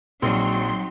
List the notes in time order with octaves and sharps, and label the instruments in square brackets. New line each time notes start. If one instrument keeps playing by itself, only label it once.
[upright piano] A#1 [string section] F#3 [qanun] C4 D#4 [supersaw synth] C6